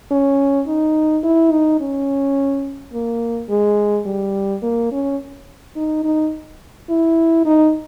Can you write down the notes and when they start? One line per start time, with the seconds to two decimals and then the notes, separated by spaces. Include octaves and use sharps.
0.11 C#4
0.67 D#4
1.23 E4
1.52 D#4
1.81 C#4
2.93 A#3
3.50 G#3
4.06 G3
4.63 A#3
4.92 C#4
5.76 D#4
6.04 D#4
6.90 E4
7.46 D#4